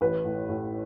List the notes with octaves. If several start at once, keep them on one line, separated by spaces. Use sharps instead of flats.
A1 B4
A2
A2